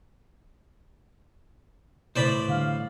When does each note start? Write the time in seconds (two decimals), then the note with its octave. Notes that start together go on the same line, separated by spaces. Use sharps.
2.16 A2 E3 C5 D5 B5
2.48 D3 G3 F5